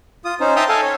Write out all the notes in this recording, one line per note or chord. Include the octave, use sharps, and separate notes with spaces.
F4 D#6
C#4 D#4 C5
E5 G5 A5 A#5 C6 D#6
A4 F5 G#5 A5
C#5